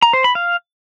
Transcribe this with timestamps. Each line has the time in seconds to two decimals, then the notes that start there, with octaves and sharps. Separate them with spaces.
0.02 A#5
0.13 C5
0.24 B5
0.35 F5